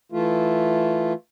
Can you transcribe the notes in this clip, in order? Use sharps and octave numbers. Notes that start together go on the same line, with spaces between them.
E3 A3 F4